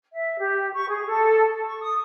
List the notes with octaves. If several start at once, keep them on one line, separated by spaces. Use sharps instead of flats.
E5
G4
C#6
G#4
A4
C#6
D#6